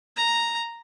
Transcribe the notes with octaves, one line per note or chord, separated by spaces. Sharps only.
A#5